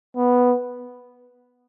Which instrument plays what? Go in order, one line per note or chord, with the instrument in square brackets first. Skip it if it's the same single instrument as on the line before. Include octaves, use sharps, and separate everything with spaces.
[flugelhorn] B3